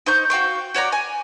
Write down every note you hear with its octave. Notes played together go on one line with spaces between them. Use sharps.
D#4 C5 C#6 G6
F#4 F5 G5 C#6
F#4 C#5 D5 A#5
G#5